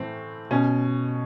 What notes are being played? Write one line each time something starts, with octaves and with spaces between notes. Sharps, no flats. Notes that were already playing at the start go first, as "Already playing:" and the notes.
Already playing: A2 E3 C4
B2 C#4